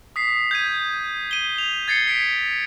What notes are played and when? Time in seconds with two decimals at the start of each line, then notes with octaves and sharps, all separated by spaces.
0.16 D#6 B6 C7
0.51 G6 G#6 D#7
1.31 D#7 G7
1.58 F7
1.88 G#6 A6 C7 C#7 G7
2.08 B6 D7